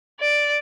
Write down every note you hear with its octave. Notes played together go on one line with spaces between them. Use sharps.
D5